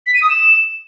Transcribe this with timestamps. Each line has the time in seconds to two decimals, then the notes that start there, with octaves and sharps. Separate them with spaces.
0.07 B6
0.14 D#7
0.22 D#6
0.30 E7